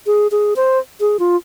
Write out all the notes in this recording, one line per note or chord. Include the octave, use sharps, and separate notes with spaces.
G#4
G#4
C5
G#4
F4